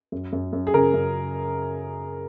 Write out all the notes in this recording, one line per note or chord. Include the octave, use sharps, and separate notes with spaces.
F#2
F#2
F#2
G#4
C#3 A#4
F#2